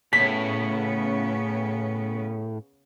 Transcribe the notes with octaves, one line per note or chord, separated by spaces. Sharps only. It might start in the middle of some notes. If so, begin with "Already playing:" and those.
A2 C#3 B3 C#4 B6